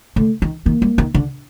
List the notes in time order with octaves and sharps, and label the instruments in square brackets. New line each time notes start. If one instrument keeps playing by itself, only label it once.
[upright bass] D3 [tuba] A3
[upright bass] D#3
[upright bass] D#3 [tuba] A#3
[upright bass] G3
D#3
D3